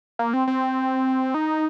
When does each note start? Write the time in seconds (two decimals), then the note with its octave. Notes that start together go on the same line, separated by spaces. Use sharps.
0.19 A#3
0.33 C4
0.47 C4
1.34 D#4